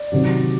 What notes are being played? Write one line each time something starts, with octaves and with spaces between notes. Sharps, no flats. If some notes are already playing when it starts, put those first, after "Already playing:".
Already playing: D5
C3 D#3 F#3